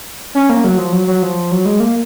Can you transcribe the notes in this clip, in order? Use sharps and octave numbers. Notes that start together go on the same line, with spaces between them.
C#4
A#3
F#3
F3
F#3
F#3
F3
F#3
G#3
A#3